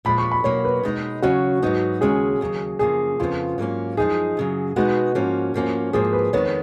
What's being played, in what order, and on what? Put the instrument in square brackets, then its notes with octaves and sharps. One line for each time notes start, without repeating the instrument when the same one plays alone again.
[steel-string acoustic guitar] A#2 F3 G#3 [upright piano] B5
[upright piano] C#6
B5
[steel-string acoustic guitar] B2 F#3 A#3 [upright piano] C#5
[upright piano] B4
[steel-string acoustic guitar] B2 G#3 D#4
[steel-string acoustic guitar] D#2 C#3 F#3 C#4 [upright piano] F#4
[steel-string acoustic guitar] G#2 F#3 B3 D#4
[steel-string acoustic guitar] D#2 C#3 G#3 C#4 [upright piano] G#4
[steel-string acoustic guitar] D#2 C#3 F#3
[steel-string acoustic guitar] F#2 C#3 F3 A#3 [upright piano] G#4
[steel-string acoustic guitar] F2 C#3 F3 B3 [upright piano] F4
[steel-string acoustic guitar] G#2 F#3 A#3 C#4
[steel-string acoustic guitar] F#2 F3 G#3 D#4 [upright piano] G#4
[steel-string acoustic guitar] F#2 C#3 F#3
[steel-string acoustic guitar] B2 G#3 B3 D#4 [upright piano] F#4
[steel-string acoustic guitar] G#2 F3 A#3 C#4
G#2 F3 A#3 C#4
[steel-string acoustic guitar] G#2 F3 A#3 [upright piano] G#4
[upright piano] B4
[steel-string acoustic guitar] F2 D#3 G#3 B3 [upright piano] C#5